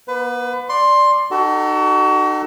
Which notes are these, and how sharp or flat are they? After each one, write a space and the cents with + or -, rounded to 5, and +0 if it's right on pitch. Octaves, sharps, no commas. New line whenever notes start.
B3 -40 B4 +25
D5 +0 C6 +10
D#4 -30 F#4 +35 A4 +0